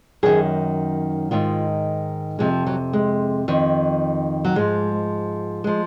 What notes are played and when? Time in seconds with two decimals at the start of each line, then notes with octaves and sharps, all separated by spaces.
0.23 F#2 D#3 G#4
1.31 G#2 D#3 F4
2.39 F2 C3 F3 G#3
2.66 F#3
2.93 G#3
3.48 F2 D#3
4.45 F#3
4.55 G#2 F3 G#3
5.64 F3 G#3